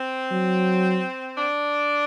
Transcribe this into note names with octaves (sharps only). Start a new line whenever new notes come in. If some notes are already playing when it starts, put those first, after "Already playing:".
Already playing: C4
F#3
D4